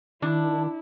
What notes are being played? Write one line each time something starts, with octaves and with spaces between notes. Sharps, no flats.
D#3 D4 E4